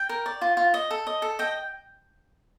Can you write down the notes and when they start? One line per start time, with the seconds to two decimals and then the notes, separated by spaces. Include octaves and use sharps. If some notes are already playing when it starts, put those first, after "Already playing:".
Already playing: G5
0.09 A#4
0.26 D5
0.41 F4
0.57 F4
0.74 D#5
0.90 A4
1.07 D#5
1.22 A4
1.39 D#5 G5